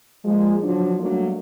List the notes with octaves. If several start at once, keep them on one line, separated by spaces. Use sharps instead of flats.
A#2 F3 G#3
D3 F3 F#3 D4
F#3 G3 A3 A#3 D4